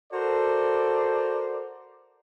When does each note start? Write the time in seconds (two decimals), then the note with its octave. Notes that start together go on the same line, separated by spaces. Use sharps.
0.12 F#4 A4 A#4 C5 D5